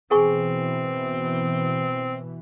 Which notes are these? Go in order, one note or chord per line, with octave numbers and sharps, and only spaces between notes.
B2 E3 C4 G#4 G#5 C#6